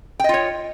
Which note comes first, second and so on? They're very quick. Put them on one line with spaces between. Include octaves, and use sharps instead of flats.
G5 D#5 F4 C#5